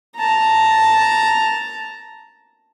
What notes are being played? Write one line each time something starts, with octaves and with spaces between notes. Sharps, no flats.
A5 A#5